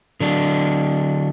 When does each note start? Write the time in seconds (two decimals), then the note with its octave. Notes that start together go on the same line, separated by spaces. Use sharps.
0.20 D3 F#3 D4